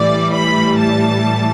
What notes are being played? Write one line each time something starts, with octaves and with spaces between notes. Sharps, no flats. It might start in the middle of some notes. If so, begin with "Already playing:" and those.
Already playing: A2 E3 G3 D5
B5
A5